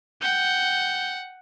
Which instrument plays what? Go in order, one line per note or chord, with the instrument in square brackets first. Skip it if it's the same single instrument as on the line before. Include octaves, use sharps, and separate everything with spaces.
[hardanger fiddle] F#5 G5 [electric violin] G6